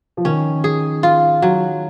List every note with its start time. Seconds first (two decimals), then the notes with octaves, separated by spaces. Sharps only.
0.17 F3
0.25 D#3 C#4
0.64 G#4
1.03 F4
1.42 F#3